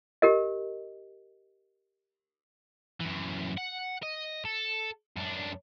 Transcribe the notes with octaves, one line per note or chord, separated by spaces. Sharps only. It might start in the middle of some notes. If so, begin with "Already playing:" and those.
G4 A#4 D#5
F#2 E3
F#5
D#5
A4
F#2 D4